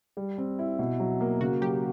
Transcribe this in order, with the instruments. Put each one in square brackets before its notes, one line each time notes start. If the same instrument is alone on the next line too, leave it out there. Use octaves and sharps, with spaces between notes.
[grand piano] G3
C4
E4
B2
F#3
A#3
[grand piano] C#3 [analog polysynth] F#4
[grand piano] F#3 [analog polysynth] G4